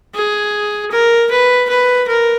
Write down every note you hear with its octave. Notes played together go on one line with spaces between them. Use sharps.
G#4
A#4
B4
B4
A#4